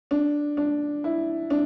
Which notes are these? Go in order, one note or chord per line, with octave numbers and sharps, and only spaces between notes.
D4
D4
E4
D4